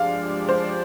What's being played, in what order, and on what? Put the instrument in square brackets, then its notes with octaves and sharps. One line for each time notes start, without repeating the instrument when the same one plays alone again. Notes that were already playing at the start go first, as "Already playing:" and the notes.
Already playing: [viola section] F3 G#3 D4 G4 D5 [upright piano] F5
[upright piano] C5